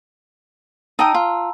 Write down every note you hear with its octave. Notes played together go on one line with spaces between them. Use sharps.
D#4 G5 A5 A#5 D#6 E6
F4